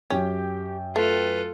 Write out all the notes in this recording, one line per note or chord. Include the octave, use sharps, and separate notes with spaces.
F#2 C#4 G4 G5
A3 F4 A4 B4